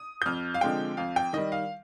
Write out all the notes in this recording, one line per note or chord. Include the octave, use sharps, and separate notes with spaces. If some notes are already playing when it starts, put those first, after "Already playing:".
Already playing: D#6
G6
F2 F6
F5
D3 F3 G#3 C4 G5
F2 F5
G5
D#3 G3 D#5
F5